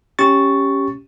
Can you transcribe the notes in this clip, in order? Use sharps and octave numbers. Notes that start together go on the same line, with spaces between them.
C#4 G4 C#6 A6